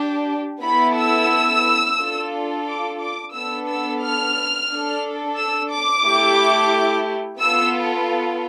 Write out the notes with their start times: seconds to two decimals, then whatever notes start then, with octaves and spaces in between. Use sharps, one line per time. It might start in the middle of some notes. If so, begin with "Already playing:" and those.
Already playing: D4 G4
0.62 B3 E4 A4 B5
0.97 E6
1.98 D4 F4 A4
2.66 D6
3.00 D6
3.33 B3 D4 A4 E6
3.67 E6
4.01 F6
4.68 D4 A4
5.36 E6
5.70 D6
6.04 A3 E4 G4
7.39 B3 F4 A4 E6